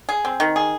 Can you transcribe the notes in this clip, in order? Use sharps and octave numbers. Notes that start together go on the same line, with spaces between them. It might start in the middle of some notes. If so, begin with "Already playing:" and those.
G#4
C4
D#3
G#4